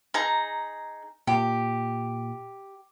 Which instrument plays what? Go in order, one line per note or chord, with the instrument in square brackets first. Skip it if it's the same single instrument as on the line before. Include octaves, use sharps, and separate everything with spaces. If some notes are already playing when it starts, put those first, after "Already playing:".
[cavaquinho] D#4 G#4 A#5
[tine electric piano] A#2 [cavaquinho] G4